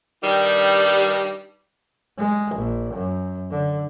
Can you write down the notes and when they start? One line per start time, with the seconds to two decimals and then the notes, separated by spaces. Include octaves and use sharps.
0.23 G2 D#3 G3
2.18 G#3
2.55 A#1
2.94 F#2
3.50 D3